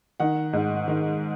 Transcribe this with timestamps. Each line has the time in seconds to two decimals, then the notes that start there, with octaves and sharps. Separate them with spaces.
0.20 D#3 F#5
0.53 G#2
0.88 D#3